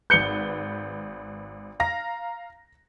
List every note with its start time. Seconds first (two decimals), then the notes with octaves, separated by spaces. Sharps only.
0.10 G#1 B4 G6 C#7 G7
1.80 F5 A#5 A#6